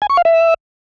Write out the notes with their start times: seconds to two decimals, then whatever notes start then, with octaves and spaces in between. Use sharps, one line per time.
0.02 G#5
0.10 C#6
0.17 F5
0.25 E5